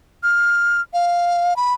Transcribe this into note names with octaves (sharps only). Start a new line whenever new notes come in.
F6
F5
B5